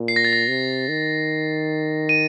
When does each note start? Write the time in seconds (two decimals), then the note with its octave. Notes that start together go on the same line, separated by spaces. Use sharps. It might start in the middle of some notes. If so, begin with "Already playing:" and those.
Already playing: A#2
0.08 C7
0.16 A#6
0.25 A6
0.33 A#6
0.49 C3
0.89 D#3
2.09 D#7